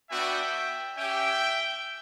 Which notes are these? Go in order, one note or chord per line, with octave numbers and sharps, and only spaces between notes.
B3 D4 F#4 E5 G5
C#4 G4 E5 G5